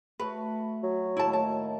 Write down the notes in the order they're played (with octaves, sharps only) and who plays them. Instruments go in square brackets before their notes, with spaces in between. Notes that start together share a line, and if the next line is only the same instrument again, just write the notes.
[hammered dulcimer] A3 F#4 B5 [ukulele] B4
[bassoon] F#3
[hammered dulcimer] A2 D#3 A#3 [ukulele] E4 A5
[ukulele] A5